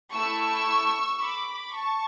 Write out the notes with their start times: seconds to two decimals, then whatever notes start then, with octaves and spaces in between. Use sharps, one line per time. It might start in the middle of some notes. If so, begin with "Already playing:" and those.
0.12 A3 E4 A4 C#6 E6
1.21 B5 D6
1.75 A5 C#6